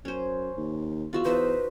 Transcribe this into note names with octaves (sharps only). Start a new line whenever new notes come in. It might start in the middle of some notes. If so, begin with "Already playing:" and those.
F#2 C#4 C5
D#2
E2 F4 F#4 E5
E2 D#4 B4 C5 E5